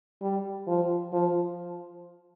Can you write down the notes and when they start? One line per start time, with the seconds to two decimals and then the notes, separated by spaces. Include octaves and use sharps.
0.22 G3
0.67 F3
1.13 F3